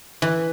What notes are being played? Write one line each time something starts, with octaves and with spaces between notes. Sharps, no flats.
E3